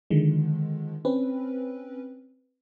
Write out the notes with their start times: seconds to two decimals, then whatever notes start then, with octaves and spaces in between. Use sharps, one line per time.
0.10 D3 D#3 F3 G#3
1.05 C4 C#4 B4